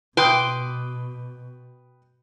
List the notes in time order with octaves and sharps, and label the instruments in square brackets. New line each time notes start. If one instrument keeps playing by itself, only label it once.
[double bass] B2 [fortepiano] B4 G5 D#6 [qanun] C6 D6